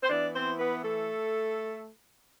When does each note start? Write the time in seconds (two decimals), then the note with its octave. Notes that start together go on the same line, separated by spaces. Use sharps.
0.03 C5
0.09 E3 B3 D4 E4 D5
0.34 C4 C5
0.59 B3 B4
0.83 A3 A4